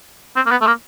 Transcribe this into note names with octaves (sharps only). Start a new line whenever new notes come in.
C4
A#3
B3
A3
A#3